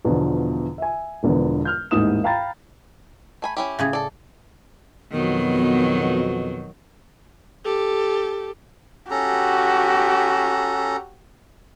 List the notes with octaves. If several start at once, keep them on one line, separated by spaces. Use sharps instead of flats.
E2 B2 D3 F3
E5 G#5
E1 E2 D3 F3 B3
F6 G6
A1 D#2 G#2 E4 D#6 E7
F5 G5 A#5 B5 A6
A3 G#5 B5
C#4 E4 G4
A2 C#3 G#4
A4 D5
F2 B2 D#3 F#3 B3
G4 A4
C#4 F#4 G4 A4 A#5